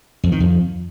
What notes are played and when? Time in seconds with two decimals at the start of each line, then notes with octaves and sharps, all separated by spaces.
0.24 F2
0.32 D#3
0.40 F2